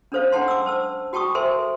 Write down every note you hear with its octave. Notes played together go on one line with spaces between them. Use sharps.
C#4 D4 A4 C5 C#5 F5
D4 F#5 G5 A5 C6
D6 E6
C5 A5 E6
F#4 G5 A5 C#6 D#6
A4 A#4 C5 E5 G#5 C6